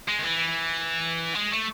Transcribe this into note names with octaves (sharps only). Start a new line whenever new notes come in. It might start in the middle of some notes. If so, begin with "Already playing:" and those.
G#3
D#3
E3
G#3
A3